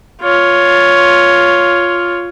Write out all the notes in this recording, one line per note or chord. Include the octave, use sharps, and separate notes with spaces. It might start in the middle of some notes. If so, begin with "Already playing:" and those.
F4 C#5